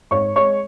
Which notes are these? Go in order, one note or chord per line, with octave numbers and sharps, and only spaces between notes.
G#2 C#5 C#6
G#3 C#5 C#6